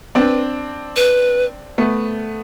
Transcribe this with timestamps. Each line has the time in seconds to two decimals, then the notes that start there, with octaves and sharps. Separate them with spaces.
0.15 C4 D4 B4
0.96 B4
1.78 A3 B3